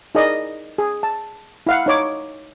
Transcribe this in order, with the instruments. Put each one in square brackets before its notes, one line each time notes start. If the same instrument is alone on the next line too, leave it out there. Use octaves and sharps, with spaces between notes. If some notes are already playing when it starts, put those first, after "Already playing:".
[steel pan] D#4 E4 G#4 A#4 D5 D#5
G#4
A5
E4 F5 F#5
D#4 C#5 D6